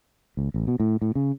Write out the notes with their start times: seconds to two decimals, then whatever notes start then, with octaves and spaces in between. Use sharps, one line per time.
0.37 C#2
0.54 A1
0.67 B2
0.80 A2
1.02 A2
1.15 C#3